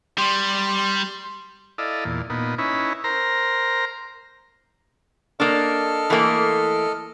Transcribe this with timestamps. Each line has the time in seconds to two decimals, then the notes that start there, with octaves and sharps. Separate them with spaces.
0.18 G3 C6
1.78 E4 A4 D5 D#5 F5
2.05 E2 A#2
2.30 A#2 B3 D#4
2.58 C#4 D#4 E4 B4
3.04 A#4 C5 A#5
5.40 A#3 D4 A4 D#5 F6
6.10 E3 A3 A#3